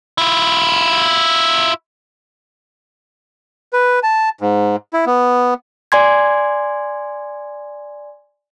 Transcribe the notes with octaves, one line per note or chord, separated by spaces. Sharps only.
E4 F4
B4
A5
G#2
E4
B3
D5 G#5 C6 G#6